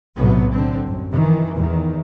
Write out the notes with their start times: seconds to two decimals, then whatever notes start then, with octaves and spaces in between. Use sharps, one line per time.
0.16 B1 A2 C3 F#3 B3
0.51 D3 C4
0.84 G1 F#2
1.13 D#3 E3
1.56 E2 D#3